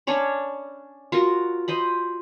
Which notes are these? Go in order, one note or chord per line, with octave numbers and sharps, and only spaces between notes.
C#4 D4 C#5 B5
F4 F#4 A#4
C5 D#5 B5